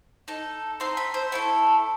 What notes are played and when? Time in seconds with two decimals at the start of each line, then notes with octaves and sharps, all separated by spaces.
0.28 D#4 A4
0.80 C4 D#4 A4 C6
0.97 B5
1.14 C5
1.32 A3 E4 A4